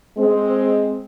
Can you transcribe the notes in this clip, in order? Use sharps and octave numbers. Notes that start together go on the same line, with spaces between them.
G#3 C4